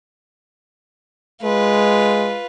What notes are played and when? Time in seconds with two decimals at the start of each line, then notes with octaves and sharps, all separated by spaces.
1.43 G#3 F4 B4